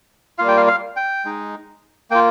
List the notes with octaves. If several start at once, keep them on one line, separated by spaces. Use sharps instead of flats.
G3 A#3 F4 F5
G5
F5
F5
G5
G#3 D#4
A#3 F4 G5